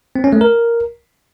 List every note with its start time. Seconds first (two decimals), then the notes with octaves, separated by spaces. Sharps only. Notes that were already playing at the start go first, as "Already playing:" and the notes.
0.16 C4
0.24 C#4
0.33 A3
0.41 A#4